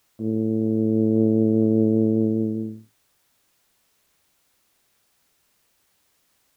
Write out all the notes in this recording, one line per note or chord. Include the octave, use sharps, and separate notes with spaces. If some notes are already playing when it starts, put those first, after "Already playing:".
A2